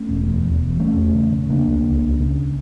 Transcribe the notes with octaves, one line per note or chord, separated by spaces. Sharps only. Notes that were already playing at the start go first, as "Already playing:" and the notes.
Already playing: A3 C#4
E1
E2
E2
E1
E1 A3 C#4
E2
C#3
C#3
C#3 A#3 D4
C#2
C#2
C#2
C#3